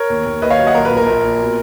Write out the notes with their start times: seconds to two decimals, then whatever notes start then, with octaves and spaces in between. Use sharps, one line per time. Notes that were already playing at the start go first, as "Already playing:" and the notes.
Already playing: A#4 C#5
0.10 D#2
0.25 D#2
0.42 D#2 B4 D#5
0.50 C#5 F5
0.59 F#3
0.67 D#5 F#5
0.75 A#1 A#4
0.85 B4
0.92 A#2
0.97 A#4
1.07 A#1
1.24 A#2
1.40 B2